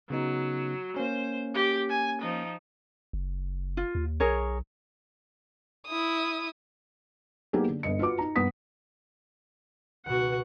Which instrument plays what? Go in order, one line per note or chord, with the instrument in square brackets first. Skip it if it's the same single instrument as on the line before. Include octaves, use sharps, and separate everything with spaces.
[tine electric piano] C#3 B3 D#4 [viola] F#3
[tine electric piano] A#3 C#4 [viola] C5
[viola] G4
G#5
F3 D#4
[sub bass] F#1
[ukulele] F4
[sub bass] D#2
[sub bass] B1 [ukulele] G#4 A#4 C#5
[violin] E4 D#6
[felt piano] F#3 A#3 B3 D#4 G4 G#4
D3
G1 G2 D#5 C#7
F4 F#4 B4 D6
D#4 A#5
G2 B3 D#6 B6
[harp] C#2 B2 [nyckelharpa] F#4 F#5